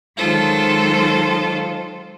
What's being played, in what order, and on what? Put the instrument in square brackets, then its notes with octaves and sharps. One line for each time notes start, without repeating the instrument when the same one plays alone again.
[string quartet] D#3 F#3 G#3 F4 A4 C5